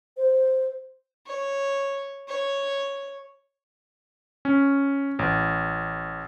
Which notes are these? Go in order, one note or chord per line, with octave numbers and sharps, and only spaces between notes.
C5
C#5
C#5
C#4
A1